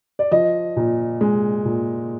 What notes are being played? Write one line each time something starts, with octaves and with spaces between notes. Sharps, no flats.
D5
F3 D#5
A#2
G#3
A#2